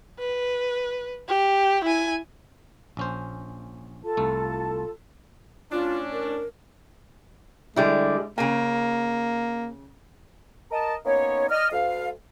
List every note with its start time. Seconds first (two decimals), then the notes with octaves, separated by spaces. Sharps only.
0.19 B4
1.28 G4
1.84 E4 G#5
2.97 A#1 C#4 C5
4.04 F4 A4 A5
4.17 C2 A3
5.72 A2 C#4 D4 F4
6.12 A#4
7.76 D3 G3 G#3 E4
8.38 C#3 A#3 G#5
10.71 A#4 D#5 A5
11.06 A#3 B3 C#4 D#4 C#5
11.50 D5 D#5 F6
11.71 D2 F5